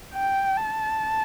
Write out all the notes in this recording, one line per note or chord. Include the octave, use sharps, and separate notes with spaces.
G5
A5